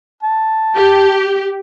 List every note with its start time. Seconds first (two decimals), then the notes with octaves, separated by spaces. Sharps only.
0.23 A5
0.75 G4